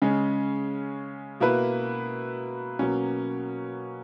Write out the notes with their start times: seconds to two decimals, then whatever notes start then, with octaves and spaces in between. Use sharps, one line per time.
0.02 C#3 G#3 C#4
1.40 B2 A#3 E4 B4
2.79 B2 F#3 A#3 C#4